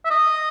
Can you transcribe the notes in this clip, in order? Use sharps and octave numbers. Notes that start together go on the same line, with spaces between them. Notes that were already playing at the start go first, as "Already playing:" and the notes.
E5
D#5